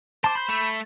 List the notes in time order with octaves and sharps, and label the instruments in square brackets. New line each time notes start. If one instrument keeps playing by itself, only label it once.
[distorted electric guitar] C5 [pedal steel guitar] A5 D6
[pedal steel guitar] B5 G6
[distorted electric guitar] A3